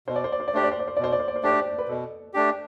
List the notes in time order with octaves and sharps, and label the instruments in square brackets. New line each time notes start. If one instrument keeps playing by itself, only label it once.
[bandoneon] B2 [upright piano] C5
[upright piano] D5
C5
D5
C5
D5
[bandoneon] A3 D4 G4 [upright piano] C5
[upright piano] D5
C5
D5
C5
[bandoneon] B2 [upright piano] D5
[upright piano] C5
D5
C5
D5
C5
[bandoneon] A3 D4 G4 [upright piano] D5
[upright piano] C5
B4
[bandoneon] B2 [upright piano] A4
[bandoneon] A3 D4 G4